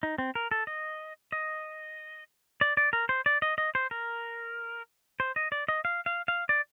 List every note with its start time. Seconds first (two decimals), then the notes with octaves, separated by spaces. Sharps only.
0.03 D#4
0.18 C4
0.35 A#4
0.51 A4
0.67 D#5
1.32 D#5
2.61 D5
2.77 D5
2.93 A#4
3.09 C5
3.26 D5
3.42 D#5
3.58 D#5
3.75 C5
3.91 A#4
5.20 C5
5.36 D#5
5.52 D5
5.68 D#5
5.85 F5
6.06 F5
6.28 F5
6.49 D5